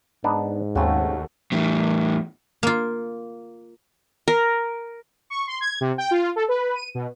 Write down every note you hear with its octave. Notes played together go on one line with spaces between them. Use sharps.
G#2 B3 D4 D#4
D#2 C#3 A3 C4 F#4
E2 A2
A#3 F4
A#4
C#6
C6
G#6
C3
G5
F4
A4
B4
D#7
B2